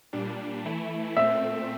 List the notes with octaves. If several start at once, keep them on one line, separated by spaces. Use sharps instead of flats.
A#2 G3 D4
E3 A3 E4
A#2 A3 C4 E5